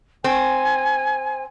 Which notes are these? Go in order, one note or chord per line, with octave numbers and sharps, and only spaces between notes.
C4 G#5